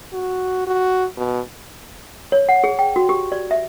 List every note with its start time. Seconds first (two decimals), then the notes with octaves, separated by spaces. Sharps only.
0.13 F#4
0.67 F#4
1.17 B2
2.32 C#5
2.49 F#5
2.64 G#4
2.79 G5
2.96 F#4
3.09 G4
3.32 D5
3.51 E5